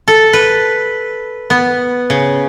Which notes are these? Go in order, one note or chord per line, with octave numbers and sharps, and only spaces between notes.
A4
B4
B3
C#3